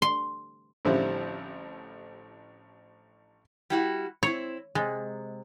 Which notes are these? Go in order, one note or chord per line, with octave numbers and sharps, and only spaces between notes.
C6
A1 D3 F3 G3 C4 E4
G3 E4 F#4
C4 E4 C#5
C3 G#3